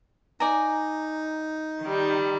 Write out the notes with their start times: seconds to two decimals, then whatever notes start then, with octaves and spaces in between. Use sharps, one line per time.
0.40 D#4 D5 G#5 A#5
1.82 D#3 G3